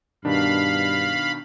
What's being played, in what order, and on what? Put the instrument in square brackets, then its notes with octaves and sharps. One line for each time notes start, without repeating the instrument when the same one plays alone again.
[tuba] G2 [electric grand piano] B2 D#3 D4 [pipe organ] F5 B5